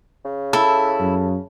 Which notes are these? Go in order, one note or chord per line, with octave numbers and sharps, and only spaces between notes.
C#3
E4 A4
F#2